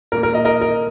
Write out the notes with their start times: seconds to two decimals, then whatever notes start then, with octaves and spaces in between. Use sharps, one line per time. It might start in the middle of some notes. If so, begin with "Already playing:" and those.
0.12 A#2 A#3 A#4
0.23 A#4
0.34 A#4 D#5
0.45 A#4 D#5
0.61 A#4